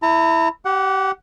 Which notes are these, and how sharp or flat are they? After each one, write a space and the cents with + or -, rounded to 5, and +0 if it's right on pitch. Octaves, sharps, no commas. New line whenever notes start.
E4 +0 A#5 -40
G4 -25 F#5 +10